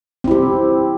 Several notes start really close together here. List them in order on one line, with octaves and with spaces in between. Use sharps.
C4 E4 G4